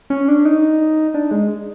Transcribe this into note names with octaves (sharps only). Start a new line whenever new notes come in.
C#4
D4
D#4
D4
G#3